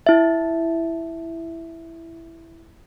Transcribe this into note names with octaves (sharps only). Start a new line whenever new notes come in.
E4 E5